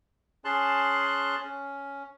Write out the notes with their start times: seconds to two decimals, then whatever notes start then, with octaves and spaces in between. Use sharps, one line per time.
0.45 C#4 G#4 A5 C6 F#6
1.41 C#4